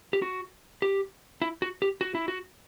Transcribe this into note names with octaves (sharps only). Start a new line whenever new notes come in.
G4
F#4
G4
E4
F#4
G4
F#4
E4
F#4